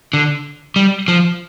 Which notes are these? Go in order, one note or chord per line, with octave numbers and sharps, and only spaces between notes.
D3
G3
F3